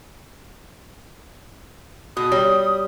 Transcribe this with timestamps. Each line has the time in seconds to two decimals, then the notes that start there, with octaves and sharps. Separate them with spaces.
2.17 B2 F#4 D#6
2.32 G3 C#5